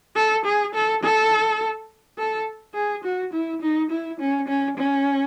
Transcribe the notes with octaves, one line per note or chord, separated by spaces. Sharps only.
A4
G#4
A4
A4
A4
G#4
F#4
E4
D#4
E4
C#4
C#4
C#4